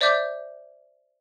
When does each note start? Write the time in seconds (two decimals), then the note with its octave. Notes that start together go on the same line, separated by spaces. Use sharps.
0.01 C5 D5 E5 D6 G6